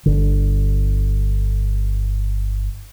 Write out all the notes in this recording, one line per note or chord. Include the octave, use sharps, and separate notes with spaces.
G1 D3